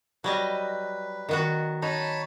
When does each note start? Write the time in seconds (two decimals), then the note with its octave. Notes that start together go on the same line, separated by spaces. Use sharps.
0.24 F#3 G3 B4 D#5
1.29 D#3 B3 F#4
1.82 D#4 C#5 A5 B5